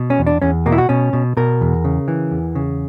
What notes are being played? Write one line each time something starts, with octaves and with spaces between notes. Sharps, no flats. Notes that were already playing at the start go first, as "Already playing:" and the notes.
Already playing: B2
C#4
E2
D4
E2 C#4
B2 A#3
E4
F#4
B2 C#4
B2
B2 A#4
E2
C#3
E3
E2
C#3